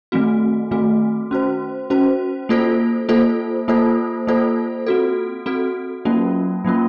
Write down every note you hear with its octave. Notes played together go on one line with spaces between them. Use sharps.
D#3 A3 C4 F#4
D#3 A3 C4 F#4
C#4 F#4 C5
C#4 F#4 C5
A#3 F4 A4 C5
A#3 F4 A4 C5
A#3 F4 A4 C5
A#3 F4 A4 C5
C4 F#4 A4
C4 F#4 A4
F#3 A#3 C#4 F4
F#3 A#3 C#4 F4